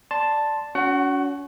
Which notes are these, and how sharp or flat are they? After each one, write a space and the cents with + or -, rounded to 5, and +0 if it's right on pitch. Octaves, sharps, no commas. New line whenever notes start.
D5 +0 A5 +0 C6 +0
C#4 +35 F#4 -10 F#5 +25